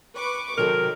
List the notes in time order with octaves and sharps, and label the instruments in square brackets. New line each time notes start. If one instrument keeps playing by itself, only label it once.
[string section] B4 C#6 D6
[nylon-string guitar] C3 F#3 A4 [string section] D#3 [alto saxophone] A#4